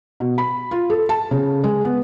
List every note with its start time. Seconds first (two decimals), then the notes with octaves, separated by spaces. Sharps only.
0.20 B2
0.38 B5
0.71 F4
0.90 A4
1.09 A5
1.31 C#3
1.64 G#3
1.85 B3